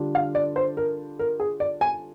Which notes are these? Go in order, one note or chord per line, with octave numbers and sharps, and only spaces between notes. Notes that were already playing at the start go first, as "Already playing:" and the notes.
Already playing: D3 G3 D4 F4
F5
D5
C5
A#4
A#4
G#4
D5
G#5